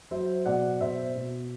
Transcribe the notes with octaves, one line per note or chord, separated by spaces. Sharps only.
F#3 C5 E5
B2 D5 F#5
B2 C5 E5
B2